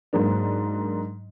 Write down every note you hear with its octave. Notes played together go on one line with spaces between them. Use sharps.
G#2 F#3 A#3 D4